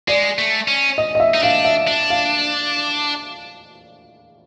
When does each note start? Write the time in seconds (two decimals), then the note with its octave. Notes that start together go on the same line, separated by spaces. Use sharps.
0.08 G#3 D5
0.39 A3
0.68 C#4
0.98 D#5
1.15 D#5
1.20 E5
1.34 D#4
1.43 D4 F5
1.65 E5
1.87 D4
2.10 F5